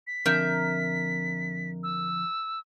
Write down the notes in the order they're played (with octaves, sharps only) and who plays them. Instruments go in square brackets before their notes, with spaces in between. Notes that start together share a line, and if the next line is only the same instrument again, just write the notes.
[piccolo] B6
[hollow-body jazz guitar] F2 D3 [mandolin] A#4 E5 G6
[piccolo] E6